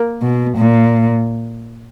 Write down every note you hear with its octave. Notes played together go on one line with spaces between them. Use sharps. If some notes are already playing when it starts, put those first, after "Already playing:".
Already playing: A#3
B2
A#2